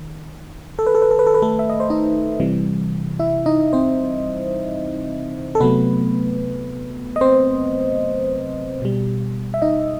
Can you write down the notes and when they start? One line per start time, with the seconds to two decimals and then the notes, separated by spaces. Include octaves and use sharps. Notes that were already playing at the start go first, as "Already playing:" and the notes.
Already playing: D#3
0.79 A4
0.87 B4
0.95 A4
1.02 B4
1.11 A4
1.19 B4
1.27 A4
1.34 B4
1.42 A3 A4
1.59 E5
1.70 D#5
1.80 C5
1.90 D#4 D#5
2.40 C3 E3 G3
3.19 E4 E5
3.46 D#4 D#5
3.73 C4 C5
5.55 A4
5.60 C3 F#3 A3 B3 B4
7.16 D#5
7.21 C4 C5
8.82 B2 G3
9.54 E5
9.62 D#4 D#5